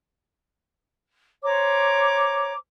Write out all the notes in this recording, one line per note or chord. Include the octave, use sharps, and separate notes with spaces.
C5 C#5 A#5 D6